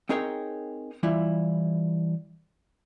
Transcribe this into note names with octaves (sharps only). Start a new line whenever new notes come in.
C4 D#4 G#4 A#4 C#5 G5
E3 G3 E4 F4